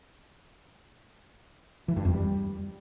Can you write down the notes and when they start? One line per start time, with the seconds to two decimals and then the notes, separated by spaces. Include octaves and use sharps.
1.88 E3
1.97 G2
2.05 F2
2.13 G3